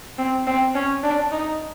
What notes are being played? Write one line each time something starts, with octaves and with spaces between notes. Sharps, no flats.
C4
C4
C#4
D4
D#4